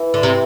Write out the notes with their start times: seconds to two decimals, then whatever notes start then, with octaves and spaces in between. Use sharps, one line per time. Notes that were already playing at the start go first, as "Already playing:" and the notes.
Already playing: E3
0.14 D3
0.23 C3